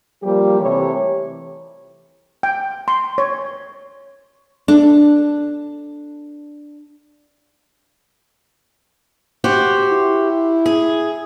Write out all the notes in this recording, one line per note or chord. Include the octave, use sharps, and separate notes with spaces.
F3 G3 A#3 G4
C3 E3 A3 G4 C#5
G5
C6
C#5
D4 A4
F#4 G4 C5
E4
G#4